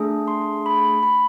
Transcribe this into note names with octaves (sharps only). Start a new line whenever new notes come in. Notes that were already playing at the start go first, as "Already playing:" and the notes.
Already playing: A3 D4 G#4
C6
B5
B5